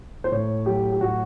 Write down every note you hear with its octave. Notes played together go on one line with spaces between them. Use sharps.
C5
A2 C#5
F#3 G4
G4
A2 F#4